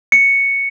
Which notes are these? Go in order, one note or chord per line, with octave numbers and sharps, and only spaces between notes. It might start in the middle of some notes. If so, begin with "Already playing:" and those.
C#7